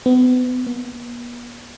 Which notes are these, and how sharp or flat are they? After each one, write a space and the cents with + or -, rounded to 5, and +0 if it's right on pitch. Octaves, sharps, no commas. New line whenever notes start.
B3 +35
B3 -45